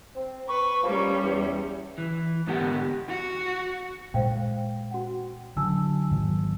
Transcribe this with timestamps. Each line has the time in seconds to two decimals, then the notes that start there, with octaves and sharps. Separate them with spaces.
0.15 C4
0.48 B4 C#6
0.83 F3 G3 A#3 C#4
1.23 E2
1.98 E3
2.47 G#2 D3 B3 G4 A#4 F#5
3.09 F#4
4.14 A#2 G#3 C5 F5 G5
4.91 F#4 F#5
5.57 D3 F#3 G#5 A5 E6
6.11 G#2 D#3 F#3